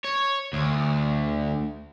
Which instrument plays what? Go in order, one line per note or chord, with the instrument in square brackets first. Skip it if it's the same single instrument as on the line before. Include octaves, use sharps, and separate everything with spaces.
[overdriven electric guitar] C#5
D2